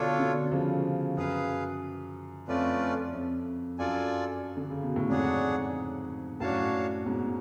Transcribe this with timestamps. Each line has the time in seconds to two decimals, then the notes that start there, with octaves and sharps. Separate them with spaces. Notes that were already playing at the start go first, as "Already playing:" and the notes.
Already playing: B2 D3 D4 F4 A4 C#5
0.19 B2 D3
0.52 C#3 F3
1.17 F#2 G#4 B4 F5
2.48 F2 A3 C#4 F4 B4 D5
3.14 F2
3.79 F#2 F4 A4 D5 G#5
4.57 D3
4.70 C#3
4.83 B2
4.96 A2
5.10 F2 G#2 D4 G#4 C#5 F#5
6.40 F#2 A2 D4 F#4 C#5 F5 A5
7.06 G#2 B2